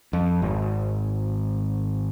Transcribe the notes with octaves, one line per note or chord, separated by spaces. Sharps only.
F2
G#1